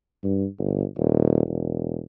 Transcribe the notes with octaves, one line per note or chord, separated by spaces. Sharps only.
G2
G1
D#1
E1